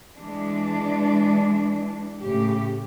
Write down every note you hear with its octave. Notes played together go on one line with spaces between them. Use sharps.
E3 G#3 D4
A2 C#3 G4